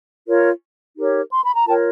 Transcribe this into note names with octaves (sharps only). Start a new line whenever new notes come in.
F4 A#4 C#5
D#4 G4 A#4 C#5
C6
B5
A#5
F4 A#4 C#5 G5 A5